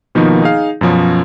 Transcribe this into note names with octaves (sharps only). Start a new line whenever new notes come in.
B2 D#3 F3 A#3 B3 D#4
D#4 G#4 F5
F#2 B2 F3 C#4